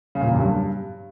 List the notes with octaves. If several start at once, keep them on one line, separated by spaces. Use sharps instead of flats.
C#3
A#2
E2
F#2
G2